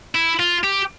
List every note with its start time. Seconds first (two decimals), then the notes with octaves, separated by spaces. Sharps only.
0.15 E4
0.40 F4
0.64 G4